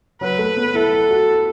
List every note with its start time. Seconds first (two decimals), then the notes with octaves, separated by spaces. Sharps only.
0.21 F#3 B4
0.38 A3
0.56 B3
0.74 E4 A4
0.92 E4
1.10 F#4